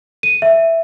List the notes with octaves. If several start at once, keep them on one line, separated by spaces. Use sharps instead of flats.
D#7
E5